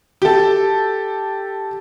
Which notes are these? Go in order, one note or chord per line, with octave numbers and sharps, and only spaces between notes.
G4 A4